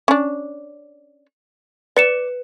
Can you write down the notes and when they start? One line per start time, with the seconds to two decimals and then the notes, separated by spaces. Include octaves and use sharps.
0.08 C#4 D4
1.97 B4 D5 C#7 E7